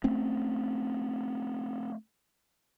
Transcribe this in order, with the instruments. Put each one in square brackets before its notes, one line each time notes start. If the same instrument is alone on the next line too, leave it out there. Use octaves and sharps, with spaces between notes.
[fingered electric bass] A3 C4 C#4